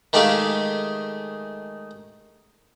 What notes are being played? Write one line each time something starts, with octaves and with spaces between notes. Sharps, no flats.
D#3 G#3 A3 G4 G#4 F5